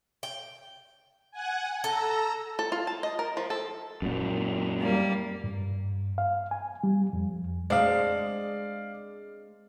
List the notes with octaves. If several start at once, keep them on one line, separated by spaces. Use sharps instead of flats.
G5
F#5 G#5
A4 A#5 E6
A4
F4
A5
D#5
A#4
F3
A4
F#2 A#2
G3 A#3
G2
F5
G#5
G3
F2
G#3 C4 D4 D5 F5